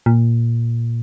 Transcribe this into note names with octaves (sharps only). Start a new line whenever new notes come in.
A#2